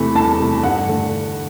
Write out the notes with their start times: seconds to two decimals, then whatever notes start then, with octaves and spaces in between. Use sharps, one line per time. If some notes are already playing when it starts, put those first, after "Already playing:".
Already playing: E2 C3 E3 A3 B5
0.15 E2 A5
0.40 C3 E3 A3
0.63 G2 F#5
0.89 D3 A3